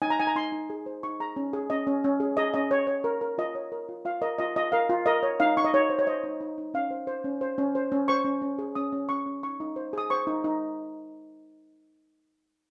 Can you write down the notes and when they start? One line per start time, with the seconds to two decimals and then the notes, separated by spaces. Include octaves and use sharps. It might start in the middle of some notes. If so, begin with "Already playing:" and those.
0.02 D#4 G#5
0.10 A#5
0.19 D#4 G#5
0.27 A#5
0.35 D#4 C6
0.52 D#4
0.70 G#4
0.86 C5
1.03 D#4 C#6
1.20 G#4 A#5
1.36 C#4
1.53 G#4
1.70 C#4 D#5
1.87 C#4
2.04 C#4
2.20 G#4
2.37 G#4 D#5
2.54 C#4 D#5
2.71 C#5
2.87 C#5
3.04 A#4
3.21 A#4
3.38 F4 D#5
3.55 C#5
3.72 A#4
3.89 F4
4.05 F4 F5
4.22 A#4 D#5
4.39 F4 D#5
4.56 F4 D#5
4.72 A#4 F5
4.89 F4
5.06 A#4 D#5
5.23 C#5
5.40 D#4 F5
5.57 D#4 C#6
5.65 D#5
5.73 D#4 C#5
5.90 C5
5.99 C#5
6.07 C5 D#5
6.24 D#4
6.41 D#4
6.58 D#4
6.74 C#4 F5
6.91 C5
7.07 C5
7.24 C#4
7.41 C5
7.58 C#4
7.75 C5
7.92 C#4
8.08 C5 C#6
8.25 C#4
8.42 C#4
8.59 G#4
8.75 C#4 D#6
8.92 C#4
9.09 C#4 C#6
9.26 C#4
9.43 D#4 C#6
9.60 D#4
9.76 C5
9.93 G#4 D#6
10.10 C5 C#6
10.27 D#4
10.44 D#4